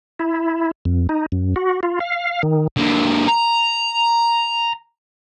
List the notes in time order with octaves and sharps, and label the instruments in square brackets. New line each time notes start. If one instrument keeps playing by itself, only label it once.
[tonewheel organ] E4
F2
D#4
F#2
F#4
F4
F5
D#3
[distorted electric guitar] D3 A#3
A#5